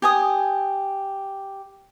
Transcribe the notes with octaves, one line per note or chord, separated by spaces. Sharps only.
G4 G#5 D#6